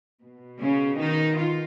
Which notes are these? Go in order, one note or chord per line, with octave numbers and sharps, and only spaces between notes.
B2
C#3 C#4
D#3 D#4
F4